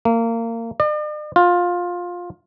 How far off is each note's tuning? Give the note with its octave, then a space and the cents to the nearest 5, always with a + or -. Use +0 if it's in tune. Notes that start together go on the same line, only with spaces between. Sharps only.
A#3 -25
D5 +45
F4 +15